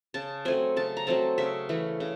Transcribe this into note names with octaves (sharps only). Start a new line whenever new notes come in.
C#3 A5
F#3 A3 C4 G#5
C#3 A5
A#5
F#3 A3 C4 A5
C#3 E5
E3 A3
C#3